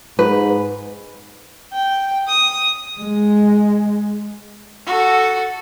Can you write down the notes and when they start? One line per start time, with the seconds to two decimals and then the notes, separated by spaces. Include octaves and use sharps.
0.19 G#2 B4
1.73 G5
2.28 D#6
3.01 G#3
4.86 F#4 A4